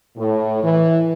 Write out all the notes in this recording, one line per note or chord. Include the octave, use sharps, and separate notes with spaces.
A2
E3